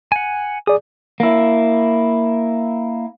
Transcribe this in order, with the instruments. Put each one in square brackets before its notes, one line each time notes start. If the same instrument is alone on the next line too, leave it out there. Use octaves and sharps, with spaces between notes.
[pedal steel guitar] F#5 G#5
[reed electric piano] G#4 D5 [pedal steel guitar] D#6
[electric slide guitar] A#3 E4